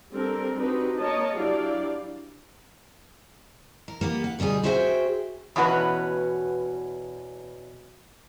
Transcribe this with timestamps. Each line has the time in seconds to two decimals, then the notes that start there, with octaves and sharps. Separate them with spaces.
0.11 G3 C4 D4 A4 A#4
0.57 C4 D4 D#4 F#4 G4 B4
0.98 A#3 A#4 C#5 D#5 A5
1.36 F#3 D4 E4 G4 D5 F5
3.88 A#4
4.01 A#3 B3 G4
4.24 F#5
4.39 D2 B2 G3 D#4 G#4
4.63 F#4 G#4 C5 E5 F#5 G5
5.56 E2 B2 C#4 F#4 B4